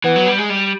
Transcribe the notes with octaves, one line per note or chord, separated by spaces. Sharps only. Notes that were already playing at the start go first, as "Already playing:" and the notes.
E3 B3
F#3
G3
G#3
G3